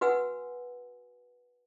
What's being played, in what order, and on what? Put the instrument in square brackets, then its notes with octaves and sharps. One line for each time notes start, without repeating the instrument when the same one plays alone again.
[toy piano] F#4 B4 F#5 G#5 E6